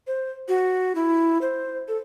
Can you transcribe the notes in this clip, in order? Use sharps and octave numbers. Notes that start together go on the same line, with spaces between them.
C5
F#4
E4
C5
A4